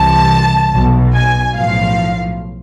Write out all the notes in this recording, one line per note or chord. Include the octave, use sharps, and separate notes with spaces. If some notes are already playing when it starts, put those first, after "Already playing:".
Already playing: C2 C3 E3 A5
B1 B2
G#5
B1 A2 F3 F5